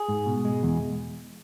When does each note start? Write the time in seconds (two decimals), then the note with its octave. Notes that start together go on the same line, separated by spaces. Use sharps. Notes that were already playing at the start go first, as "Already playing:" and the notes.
Already playing: G#4
0.08 G#2
0.26 B2
0.45 G#3
0.63 E2